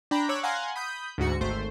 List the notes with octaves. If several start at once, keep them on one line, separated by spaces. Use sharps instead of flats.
D4 G5 A#5 B5
C#5 D6 E6 F#6
F5 F#5 G#5 A#5 C6
B5 D#6 G6
D2 G#2 F#4 C#7
G#1 A3 C5